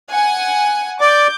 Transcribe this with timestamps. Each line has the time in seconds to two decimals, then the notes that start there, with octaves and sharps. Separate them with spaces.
0.11 F#5 G#5
1.01 D5 D6 G6